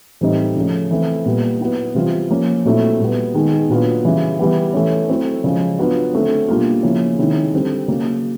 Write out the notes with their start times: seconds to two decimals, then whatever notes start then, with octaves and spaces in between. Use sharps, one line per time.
0.21 A2 E3 G3 C4 D#4
0.55 C#3 F3 A3 C#4
0.91 E3 A3 C4
1.26 A#2 G3 B3
1.60 F#3 B3 E4
1.95 C3 E3 G3 C4 F4
2.30 F3 A#3 C#4
2.65 A#2 F#3 A3 C4 E4
3.00 A#2 G3 B3
3.34 D#3 G#3 B3
3.69 A#2 F#3 B3 D4 F4
4.05 C#3 E3 G3
4.39 E3 G3 B3
4.74 E3 A3 C#4
5.09 F#3 A3 C4 E4
5.44 C#3 F3 G#3
5.79 F#3 B3 D4 F4
6.14 D3 F#3 A3 C4
6.49 B2 G3 A#3 D4 F4
6.83 C#3 F3 A#3 C#4 E4
7.18 C3 D#3 G#3 C#4 E4
7.53 D3 G3 C4
7.88 C#3 F#3 A#3